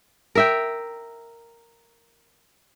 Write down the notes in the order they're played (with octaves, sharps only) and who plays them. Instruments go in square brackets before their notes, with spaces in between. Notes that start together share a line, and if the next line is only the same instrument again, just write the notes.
[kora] A#4 E5 G5